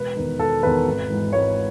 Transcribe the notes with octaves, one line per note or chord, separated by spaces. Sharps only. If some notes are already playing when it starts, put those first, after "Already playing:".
Already playing: E1 B4
E2 D#3
E1 A4
E2 D#3 B4
G#1
G#2 E3
G#1 C#5